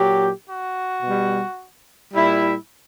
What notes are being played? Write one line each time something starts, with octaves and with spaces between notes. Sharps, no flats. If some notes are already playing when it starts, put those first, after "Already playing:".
Already playing: A#2 F#3 G4
F#4
B2 G3
A#2 G3 E4